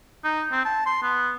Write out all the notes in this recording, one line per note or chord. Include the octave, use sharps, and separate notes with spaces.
D#4
C4
A5
C6
B3